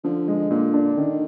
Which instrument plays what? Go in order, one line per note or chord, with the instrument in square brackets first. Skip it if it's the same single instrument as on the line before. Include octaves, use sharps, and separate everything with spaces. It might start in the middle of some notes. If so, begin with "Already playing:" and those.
[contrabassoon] D3 [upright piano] F3
[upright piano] G#3
[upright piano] A#2 [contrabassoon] D3
[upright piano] D4
D#3